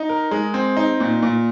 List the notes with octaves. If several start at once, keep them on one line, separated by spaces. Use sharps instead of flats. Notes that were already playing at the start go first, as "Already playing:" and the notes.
Already playing: D#4
A#4
G#3
C4
D#4
A#2
A#2